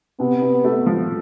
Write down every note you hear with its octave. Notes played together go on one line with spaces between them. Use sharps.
C3 B3
C3
A3
F3